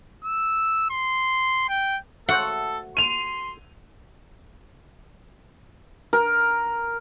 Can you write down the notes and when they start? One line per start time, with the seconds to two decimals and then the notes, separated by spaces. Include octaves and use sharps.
0.25 E6
0.90 C6
1.69 G5
2.29 A3 F#4 A4 C5 F#5
2.97 C6 D#7 F7
6.13 A#4